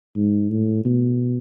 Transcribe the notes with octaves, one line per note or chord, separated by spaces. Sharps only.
G#2
A2
B2